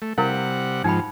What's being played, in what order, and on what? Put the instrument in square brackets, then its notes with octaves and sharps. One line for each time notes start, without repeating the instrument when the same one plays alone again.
[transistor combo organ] A3
[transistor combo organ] C3 G3 F#5 [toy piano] E4 A#4 F5
[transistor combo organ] G#2 F3 [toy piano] D#4 G5 B5